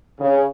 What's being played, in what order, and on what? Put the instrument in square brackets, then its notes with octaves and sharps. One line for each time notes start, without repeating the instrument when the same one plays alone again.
[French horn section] C#3